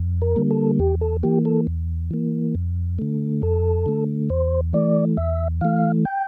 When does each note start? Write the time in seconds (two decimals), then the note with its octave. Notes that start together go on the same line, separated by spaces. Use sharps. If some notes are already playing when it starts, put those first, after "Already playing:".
Already playing: F2
0.22 A#4
0.36 D3 G3 A#3
0.51 A4
0.79 E2 G4
1.01 A4
1.23 E3 A#3 G4
1.45 A4
1.67 E2
2.11 E3 A#3
2.55 F2
2.99 D3 A3
3.42 F2 A4
3.86 D3 A3
4.30 E2 C5
4.73 E3 A3 D5
5.17 E2 E5
5.61 E3 A3 F5
6.05 G5